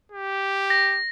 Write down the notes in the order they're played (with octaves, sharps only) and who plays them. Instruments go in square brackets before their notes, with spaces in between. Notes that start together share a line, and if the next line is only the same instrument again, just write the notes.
[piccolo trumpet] G4
[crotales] A#6